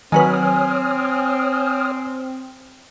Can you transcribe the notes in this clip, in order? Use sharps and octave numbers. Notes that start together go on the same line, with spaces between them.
D#3 F#3 C4 B4 C#5 G#5 D#6 F6